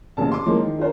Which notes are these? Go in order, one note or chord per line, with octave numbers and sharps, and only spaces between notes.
A1 A#2 C#3 A5
C6 D6
E3 F3 G#3 A#3 C#4
D#3
D4 F4 A#4 C5 C#5